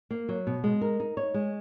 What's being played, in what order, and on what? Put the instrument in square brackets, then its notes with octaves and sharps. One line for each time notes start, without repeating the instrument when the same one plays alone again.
[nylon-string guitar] A#3
F#3
B2
G#3
A#4
D#4
C#5
G#3